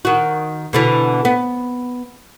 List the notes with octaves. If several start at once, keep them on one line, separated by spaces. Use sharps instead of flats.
D#3 F#4
B2 D3 E3
B3